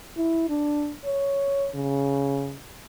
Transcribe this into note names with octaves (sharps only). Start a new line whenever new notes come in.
E4
D4
C#5
C#3